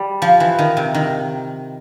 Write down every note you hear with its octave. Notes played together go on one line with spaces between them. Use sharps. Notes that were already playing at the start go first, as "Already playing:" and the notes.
Already playing: G3
F3
E3
D#3
C3
D#3